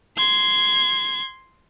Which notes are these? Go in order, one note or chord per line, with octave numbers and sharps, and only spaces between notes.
C6 G#6